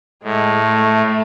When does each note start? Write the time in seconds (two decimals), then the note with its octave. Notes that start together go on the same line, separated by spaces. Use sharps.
0.23 A2 G#3
0.64 A3